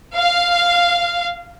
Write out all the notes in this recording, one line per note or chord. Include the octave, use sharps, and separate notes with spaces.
F5